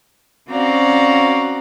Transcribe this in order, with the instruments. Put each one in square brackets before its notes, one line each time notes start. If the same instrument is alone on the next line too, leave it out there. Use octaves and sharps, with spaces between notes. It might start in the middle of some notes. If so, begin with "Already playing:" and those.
[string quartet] C4 C#4 F#4 D5 F5 A#5